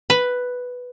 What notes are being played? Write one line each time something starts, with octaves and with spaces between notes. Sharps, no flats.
B4